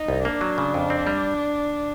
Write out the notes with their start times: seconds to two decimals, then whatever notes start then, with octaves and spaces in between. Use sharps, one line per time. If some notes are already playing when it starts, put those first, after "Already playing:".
Already playing: D#4
0.08 C2
0.25 A#3 D4
0.41 F#3
0.58 C#3
0.74 F2
0.90 C4
1.07 G3